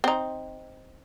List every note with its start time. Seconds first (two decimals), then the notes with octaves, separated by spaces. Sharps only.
0.04 C4 D#4